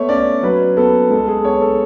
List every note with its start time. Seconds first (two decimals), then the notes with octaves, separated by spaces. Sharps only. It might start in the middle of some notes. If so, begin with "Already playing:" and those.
Already playing: A3 B3 C#5
0.09 C#4 D5
0.43 F#3 B4
0.77 B3 A4
1.10 G#3 A4
1.27 G#4
1.44 B3 C#5
1.61 A4